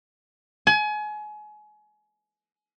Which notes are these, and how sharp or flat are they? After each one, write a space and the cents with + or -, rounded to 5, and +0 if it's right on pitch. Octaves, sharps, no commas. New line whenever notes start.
G#5 +30